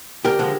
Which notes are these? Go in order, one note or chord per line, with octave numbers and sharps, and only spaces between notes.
D2 G4 A#4
D3 F3 G#3